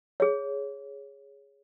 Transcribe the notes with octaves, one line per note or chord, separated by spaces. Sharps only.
G#4 C#5